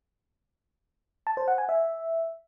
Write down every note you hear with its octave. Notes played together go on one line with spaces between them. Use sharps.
A5
C5
F#5
G#5
E5